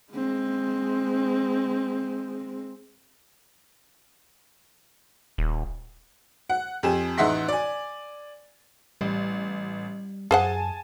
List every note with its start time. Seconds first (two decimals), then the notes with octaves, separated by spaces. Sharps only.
0.13 G#3 C4
5.38 D#1
6.50 F#5
6.83 F2 G4 G#5 E7
7.18 A1 D#4 E5 F#5 C6 B6
7.48 D5 G#5
9.01 A1 G3
10.31 F#2 G#4 C5 F#5 G#5 A5